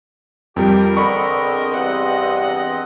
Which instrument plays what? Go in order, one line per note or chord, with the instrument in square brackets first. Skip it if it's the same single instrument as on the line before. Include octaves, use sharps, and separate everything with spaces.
[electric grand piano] F2 G3 [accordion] G4 G5 [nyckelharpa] A#4
[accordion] E2 C4 D#5 [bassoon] D3 [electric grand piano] B5 C#6
[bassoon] G2 [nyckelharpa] F#5